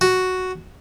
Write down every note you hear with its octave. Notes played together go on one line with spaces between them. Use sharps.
F#4